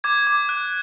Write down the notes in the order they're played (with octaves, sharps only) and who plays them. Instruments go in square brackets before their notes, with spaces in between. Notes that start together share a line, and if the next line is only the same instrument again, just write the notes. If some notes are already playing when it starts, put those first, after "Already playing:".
[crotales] D6 G#6
D6
F#6